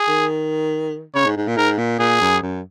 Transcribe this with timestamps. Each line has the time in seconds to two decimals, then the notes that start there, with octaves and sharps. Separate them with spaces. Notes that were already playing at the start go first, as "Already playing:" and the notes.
Already playing: G#4
0.09 D#3
1.14 C#3 C#5
1.25 G#2
1.37 G#2
1.47 A#2
1.57 G#2 A#4
1.78 A#2
1.99 A#2 G#4
2.21 F#2
2.42 F#2